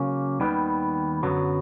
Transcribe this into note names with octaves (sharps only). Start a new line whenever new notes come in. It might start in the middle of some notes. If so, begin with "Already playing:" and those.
Already playing: C#3 F#3 A#3 C#4
D#2 D#3 G3 B3
F#2 D3 F#3 B3